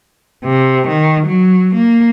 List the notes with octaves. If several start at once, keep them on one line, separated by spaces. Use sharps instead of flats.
C3
D#3
F#3
A#3